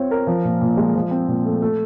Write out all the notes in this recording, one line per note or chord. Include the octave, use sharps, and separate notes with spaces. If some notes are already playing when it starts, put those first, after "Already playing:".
Already playing: C4 F4 C#5
A#4
F3
A#2
A#2
G#3
F3
C4
A#2
A3
A3